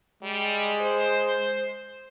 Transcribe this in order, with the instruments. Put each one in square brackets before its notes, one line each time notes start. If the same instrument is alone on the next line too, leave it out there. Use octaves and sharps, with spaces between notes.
[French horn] G3 [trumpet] G#3
[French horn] C5